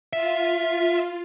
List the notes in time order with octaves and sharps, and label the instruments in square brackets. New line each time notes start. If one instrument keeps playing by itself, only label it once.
[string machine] F4 [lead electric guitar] E5